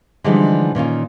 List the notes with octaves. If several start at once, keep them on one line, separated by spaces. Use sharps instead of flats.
D3 E3 F3 G3 G#3 D#4
A#2 D#3 C#4 F4